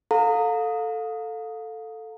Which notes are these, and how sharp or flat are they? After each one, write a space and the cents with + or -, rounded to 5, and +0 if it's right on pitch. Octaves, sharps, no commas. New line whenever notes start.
A4 +5 F5 +30 A#5 -25